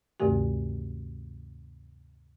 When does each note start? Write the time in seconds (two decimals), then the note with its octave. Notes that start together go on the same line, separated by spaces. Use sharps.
0.20 D2 G2 C3 D#3 A3 G4